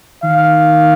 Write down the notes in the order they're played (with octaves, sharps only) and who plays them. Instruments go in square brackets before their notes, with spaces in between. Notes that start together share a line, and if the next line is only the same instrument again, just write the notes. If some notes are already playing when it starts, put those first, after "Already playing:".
[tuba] D#3 [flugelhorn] F5